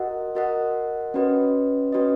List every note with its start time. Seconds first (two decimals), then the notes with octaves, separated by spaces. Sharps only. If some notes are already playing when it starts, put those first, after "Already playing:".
Already playing: F#4 A#4 D#5 F#5
0.35 F#4 A#4 D#5 F#5
1.14 C#4 F#4 B4 D#5
1.92 C#4 F#4 B4 D#5